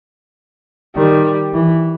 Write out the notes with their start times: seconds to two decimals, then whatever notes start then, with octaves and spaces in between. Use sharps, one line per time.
0.96 D#3 G3
1.54 E3